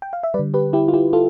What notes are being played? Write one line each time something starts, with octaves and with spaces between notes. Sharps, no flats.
G5
F5
E5
G3 B4 D5
D3
G4 B4
E4 G4
F4
E4 G4
F4 A4